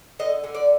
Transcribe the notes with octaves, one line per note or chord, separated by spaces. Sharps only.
D3 D#5
D3
D5